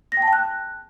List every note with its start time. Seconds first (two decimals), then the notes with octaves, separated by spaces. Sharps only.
0.12 A#6
0.17 G5
0.22 A5
0.28 G5
0.33 F#6